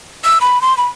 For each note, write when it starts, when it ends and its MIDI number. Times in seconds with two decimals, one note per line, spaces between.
0.24 0.38 88
0.41 0.61 83
0.62 0.76 84
0.77 0.88 83